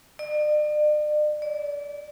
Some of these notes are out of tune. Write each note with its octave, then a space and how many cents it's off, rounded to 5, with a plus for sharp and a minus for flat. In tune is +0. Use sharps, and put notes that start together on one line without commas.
D5 +40
D5 -25